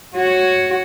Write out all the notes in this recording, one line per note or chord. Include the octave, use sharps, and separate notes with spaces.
F#4 C#5